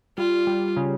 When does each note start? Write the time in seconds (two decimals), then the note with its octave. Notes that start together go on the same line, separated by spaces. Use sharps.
0.18 G3 F4
0.47 G3
0.77 C#3